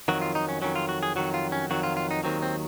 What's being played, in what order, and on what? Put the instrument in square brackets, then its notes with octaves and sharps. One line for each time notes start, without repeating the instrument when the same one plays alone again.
[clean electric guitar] F2 D#3 F#3 F#4
F4
D#4
C#4
F2 D#3 F#3 C#4
F4
F#4
G#4
F2 D#3 F#3 F#4
F4
C#4
F2 D#3 F#3 F#4
F4
F4
D#4
D#2 D#3 F#3 C4
C4